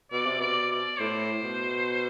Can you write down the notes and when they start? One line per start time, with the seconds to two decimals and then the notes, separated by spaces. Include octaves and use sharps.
0.11 B2 D5
0.26 C3
0.39 B2 D5
0.71 D5
0.99 A2 C5
1.43 B2